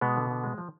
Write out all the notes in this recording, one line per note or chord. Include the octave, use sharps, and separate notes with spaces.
B2 G#3 B3
D3
D3
G#3
F3